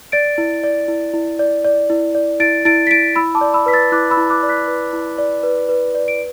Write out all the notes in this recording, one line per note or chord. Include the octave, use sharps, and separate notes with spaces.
D5 A6 D7
E4
D5
E4
E4
D5
D5
E4
D5
E4 A6 D7
E4 A6 D7
B6
E4 A6 D7
E4 B5 E6
A5 D6
D5
B5 E6
B4 B6
E6 A6
E4 D6 F#6
B5 E6
E4
D6 F#6
D5
F#6 B6
B4
E4
D5
B4
B4
D5
D7